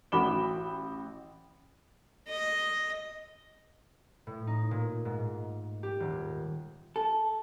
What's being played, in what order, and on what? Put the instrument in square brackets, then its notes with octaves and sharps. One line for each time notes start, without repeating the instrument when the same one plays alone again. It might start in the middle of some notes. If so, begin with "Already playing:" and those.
[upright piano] A1 F#4 B5 D6 E7 G7
[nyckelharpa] D#5
[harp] A2
D#4
A#2
G#2
G4
D#1
[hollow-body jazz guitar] A4